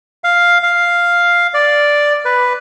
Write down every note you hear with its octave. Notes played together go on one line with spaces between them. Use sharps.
F5
F5
D5
B4